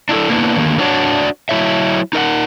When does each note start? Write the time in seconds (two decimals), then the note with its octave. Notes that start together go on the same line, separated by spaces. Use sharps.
0.09 D4 E4 F4 A4
0.30 A#3 B3 D4 E4
0.57 D3 D#3 A#3
0.78 A#3 C4 D4 F#4 C#5 D5
1.49 F#3 E4 C#5 E5
2.13 D#4 A#4 E5 F#5